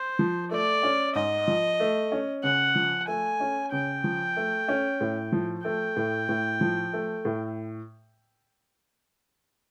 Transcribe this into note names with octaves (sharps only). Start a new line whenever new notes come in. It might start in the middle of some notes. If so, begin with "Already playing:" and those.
Already playing: C5
F3
A3 D5
C#4
G#2 D#5
F3
A3
C#4
C#3 F#5
F3
A3 G#5
C#4
C#3 G5
F3
A3
C#4
A2
F3
A3 G5
A2
A2
F3
A3
A2